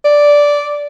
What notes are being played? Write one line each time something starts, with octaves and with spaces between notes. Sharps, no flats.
D5